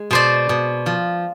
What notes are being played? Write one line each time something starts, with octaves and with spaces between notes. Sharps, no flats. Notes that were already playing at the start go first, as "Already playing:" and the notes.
Already playing: G#3
B2 C5 D5
B2
F3